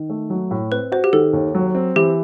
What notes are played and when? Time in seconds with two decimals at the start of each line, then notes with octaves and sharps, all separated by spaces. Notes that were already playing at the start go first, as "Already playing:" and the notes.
Already playing: D#3
0.10 A3
0.30 F#3
0.51 A2
0.71 C4 B4
0.92 F#4 C5
1.04 G4
1.13 D#3 A4
1.33 D#2
1.55 F#3
1.75 C4
1.96 E3 G4